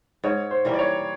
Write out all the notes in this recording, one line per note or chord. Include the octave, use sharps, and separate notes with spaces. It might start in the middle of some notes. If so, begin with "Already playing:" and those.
G#2 C#5
C5
E3 G3 A#3
D5
C#5